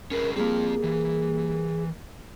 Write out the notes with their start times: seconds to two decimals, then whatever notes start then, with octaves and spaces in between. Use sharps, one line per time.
0.11 C#4 G#4 A#4 B4
0.36 G3 A#3 C4 F4 G#4
0.84 E3